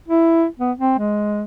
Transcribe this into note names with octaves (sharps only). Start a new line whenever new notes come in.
E4
B3
C4
G#3